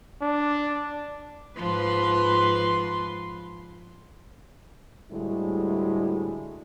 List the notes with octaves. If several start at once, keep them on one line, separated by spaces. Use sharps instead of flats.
D4
G#2 F3 B4 C6
D2 A2 G3 G#3 E4